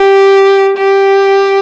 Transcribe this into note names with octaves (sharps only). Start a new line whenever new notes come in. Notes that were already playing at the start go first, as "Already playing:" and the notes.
Already playing: G4
G4